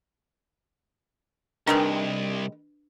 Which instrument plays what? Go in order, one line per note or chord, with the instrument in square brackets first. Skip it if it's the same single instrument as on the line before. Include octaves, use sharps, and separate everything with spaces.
[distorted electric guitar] C2 [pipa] D#3 G3 G#3 [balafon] D4 B4